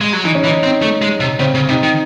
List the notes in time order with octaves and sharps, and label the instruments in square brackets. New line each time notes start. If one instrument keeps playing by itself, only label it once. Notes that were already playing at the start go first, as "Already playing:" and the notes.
[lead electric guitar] G#3
F#3
[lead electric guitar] E3 [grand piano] D#4
[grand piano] C#4
[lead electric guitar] E3
[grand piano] D#4
[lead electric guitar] C4
A3
G#3
C3
[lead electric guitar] C#3 [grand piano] C4
[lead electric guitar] C#3
[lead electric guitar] C3 [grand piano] D#4
[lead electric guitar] D#3